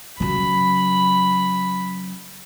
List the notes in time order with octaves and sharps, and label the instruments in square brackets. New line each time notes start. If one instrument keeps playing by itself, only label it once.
[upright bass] C#3 F#3 [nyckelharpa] B5